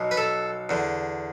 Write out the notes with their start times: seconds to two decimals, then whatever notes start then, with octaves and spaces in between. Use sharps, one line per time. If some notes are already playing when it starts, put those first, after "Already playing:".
Already playing: B1 B2
0.11 B4
0.17 A4
0.69 E2 D3